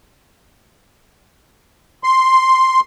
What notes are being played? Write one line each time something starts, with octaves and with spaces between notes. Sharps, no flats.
C6